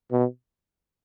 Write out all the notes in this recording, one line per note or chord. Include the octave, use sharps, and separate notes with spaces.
B2